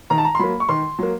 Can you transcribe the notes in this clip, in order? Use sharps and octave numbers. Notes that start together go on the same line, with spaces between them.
D#3 A#5
A5
A#5
C6
F#3 A#3 B5
C#6
D#3 C6
F#3 A#3